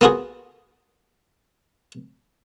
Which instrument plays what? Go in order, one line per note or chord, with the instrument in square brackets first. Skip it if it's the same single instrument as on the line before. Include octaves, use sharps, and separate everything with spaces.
[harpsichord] A#3 B3 F4 F#4 G#4